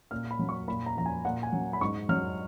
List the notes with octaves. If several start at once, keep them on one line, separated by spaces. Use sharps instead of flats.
A#2 F6
B5
F#3
C#6
A#2 B5
A#5
F3 A#5
G#5
A#2 F#5
G#5
F#3
B5
G#2 C#6
F#3 F6